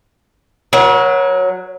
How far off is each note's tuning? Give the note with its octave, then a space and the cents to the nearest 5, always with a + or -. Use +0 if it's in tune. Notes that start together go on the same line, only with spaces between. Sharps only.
F#3 -10 A#4 +45